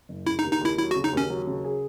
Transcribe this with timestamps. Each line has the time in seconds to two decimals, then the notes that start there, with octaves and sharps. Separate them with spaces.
0.09 F#1
0.27 C#3 E4
0.39 D#4
0.44 D#2
0.53 D#4
0.61 D#2 E4
0.78 F#3 E4
0.91 F#4
0.96 C#3
1.04 D#4
1.13 D#2 C#4
1.30 F#3
1.47 C#3
1.64 G#4